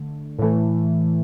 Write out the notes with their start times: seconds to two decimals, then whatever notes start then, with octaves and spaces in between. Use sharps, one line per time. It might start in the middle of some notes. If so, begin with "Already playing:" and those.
Already playing: D3 A3
0.39 A2 E3 A3